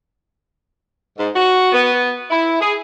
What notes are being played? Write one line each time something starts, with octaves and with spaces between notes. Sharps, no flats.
G#2
F#4
B3
E4
G#4